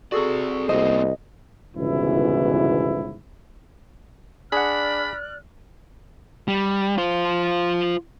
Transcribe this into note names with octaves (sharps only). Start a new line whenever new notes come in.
C4 F#4 G#4 A4 D5
C2 A#3 B3 C5 D#5
G1 C#2 G#2 B2 E3 E4
D4 G#4 D5 F#5 B5 F6 F#6
G3
F4 C5